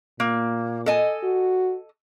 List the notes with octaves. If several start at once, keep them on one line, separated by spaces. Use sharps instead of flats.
A#2 A#3
A4 D#5 G#5
F#4